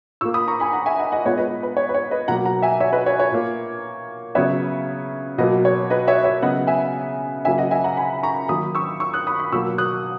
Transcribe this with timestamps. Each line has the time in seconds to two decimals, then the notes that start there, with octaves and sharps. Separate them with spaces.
0.21 A#2 A#3 C#6 E6
0.34 B5 D#6
0.48 A#5 C#6
0.60 G#5 B5
0.73 F#5 A#5
0.86 E5 G#5
0.99 D#5 F#5
1.12 D#5 F#5
1.25 A#2 G#3 B3 C#5
1.37 B4 D#5
1.63 B4
1.77 C#5
1.89 B4
1.94 C#5
2.11 B4 D#5
2.28 B2 F#3 A#3 F#5 A#5
2.46 F#5 A#5
2.62 E5 G#5
2.80 C#5 E5
2.93 B4 D#5
3.06 C#5
3.20 C#5
3.31 A#2 A#3
4.35 C#3 F#3 B3 C#5 E5
5.38 B2 F#3 A#3 B4 D#5
5.65 C#5
5.90 B4 D#5
6.08 C#5 E5
6.24 C#5 E5
6.42 C#3 F#3 B3 D#5 F#5
6.67 E5 G#5
7.45 C#3 F#3 A#3 E5 G#5
7.58 D#5 F#5
7.71 E5 G#5
7.84 F#5 A#5
7.97 G#5 B5
8.23 A#5 C#6
8.48 D#3 F#3 A#3 B5 D#6
8.75 C#6 E6
9.00 C#6 E6
9.13 D#6 F#6
9.27 B5 D#6
9.40 B5 D#6
9.52 B2 F#3 A#3 C#6 E6
9.78 D#6 F#6